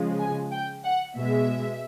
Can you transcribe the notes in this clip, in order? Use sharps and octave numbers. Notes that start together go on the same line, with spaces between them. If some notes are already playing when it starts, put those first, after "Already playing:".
Already playing: C#3 F3 G#3
G#5
G5
F#5
B2 G#3 E5